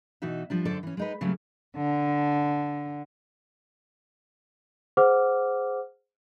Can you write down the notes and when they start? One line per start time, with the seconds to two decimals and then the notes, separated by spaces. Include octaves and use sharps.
0.22 B2 E3 D#4 F#4 E5
0.50 F3 G3 D4
0.65 F#2 D3 A4 C5 D5
0.83 E3 C#4
0.97 G#3 D#4 B4
1.21 C#3 F#3 G3 A3 A#3 C#4
1.76 D3
4.97 G#4 C5 F#5 D6 F6